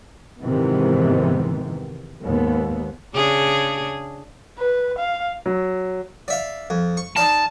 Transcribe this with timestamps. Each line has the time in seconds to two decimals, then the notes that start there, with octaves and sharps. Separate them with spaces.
0.41 F2 G#2 C3 D#3 E3 B3
2.23 D#2 G#2 B3
3.15 C#3 D4 G#4
4.58 B4
4.98 F5
5.46 F#3
6.28 D5 E5 F5
6.70 F2
6.97 C#6
7.17 D#4 D5 F5 A5